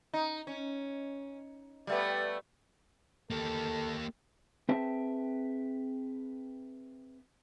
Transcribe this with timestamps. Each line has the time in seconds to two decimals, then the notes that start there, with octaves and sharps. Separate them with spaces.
0.13 D#4
0.47 C#4
1.87 G3 A3 B3
3.30 A#3 G4 A4
4.69 C4 G#4 B4 E5 G5 A5